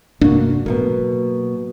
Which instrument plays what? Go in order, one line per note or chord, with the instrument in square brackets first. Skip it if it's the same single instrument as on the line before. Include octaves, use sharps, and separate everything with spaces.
[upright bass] G2 C3 [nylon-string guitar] A#3 F#4 [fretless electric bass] D4
[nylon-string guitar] B2 A#4 [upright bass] F#3 A#3